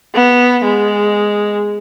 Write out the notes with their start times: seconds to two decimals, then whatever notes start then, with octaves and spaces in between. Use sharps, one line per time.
0.15 B3
0.65 G#3